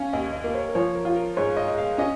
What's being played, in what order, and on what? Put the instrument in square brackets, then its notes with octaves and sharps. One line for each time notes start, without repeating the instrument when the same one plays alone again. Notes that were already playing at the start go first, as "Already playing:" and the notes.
Already playing: [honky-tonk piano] C#4 [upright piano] F5 G#5
[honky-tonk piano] D#2 [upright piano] D#5
[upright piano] D#5
[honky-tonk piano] A#3
[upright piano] C#5
A#4
[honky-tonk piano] F3 [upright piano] C#5
[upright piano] A#4
[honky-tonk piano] F4
[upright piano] A#4
[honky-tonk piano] G#2 [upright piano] C#5
[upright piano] D#5
[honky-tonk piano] G#3
[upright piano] F5
[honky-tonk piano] C#4 [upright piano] D#5